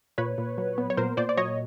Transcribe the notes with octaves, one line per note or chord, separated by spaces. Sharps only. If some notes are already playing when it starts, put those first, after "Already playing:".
A#2 B4 C#5
A#2
F#3
B3
C#5
A#2 A#4 C5
A#2 C5 D5
D5
F#3 C#5 D#5